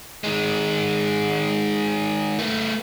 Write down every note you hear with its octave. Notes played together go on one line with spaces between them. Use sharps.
D#3 G#3
A3 B3